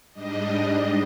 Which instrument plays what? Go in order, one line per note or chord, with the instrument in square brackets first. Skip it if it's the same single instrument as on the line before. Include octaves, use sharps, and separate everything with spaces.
[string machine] G#2 G3 D4 D#5